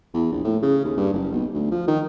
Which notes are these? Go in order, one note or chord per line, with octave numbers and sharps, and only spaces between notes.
E2
A#1
A2
C#3
D#2
G2
F#1
B1
D2
F3
D#3